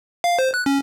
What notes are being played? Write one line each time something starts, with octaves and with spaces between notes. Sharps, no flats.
F5
C5
F#6
C#4